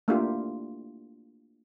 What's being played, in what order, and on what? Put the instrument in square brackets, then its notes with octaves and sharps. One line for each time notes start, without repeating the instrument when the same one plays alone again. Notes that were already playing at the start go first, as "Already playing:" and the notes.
[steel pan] A3 A#3 D4 E4 F4 G4